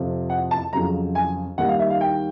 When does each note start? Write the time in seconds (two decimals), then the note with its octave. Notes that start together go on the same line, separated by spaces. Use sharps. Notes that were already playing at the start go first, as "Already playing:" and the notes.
Already playing: F2 C3 F3
0.30 F#5
0.51 A5
0.73 F2 C#3 F#3 A#5
1.15 G#5
1.58 D#2 D#3 G3 F#5
1.69 F5
1.79 E5
1.90 F5
2.01 G5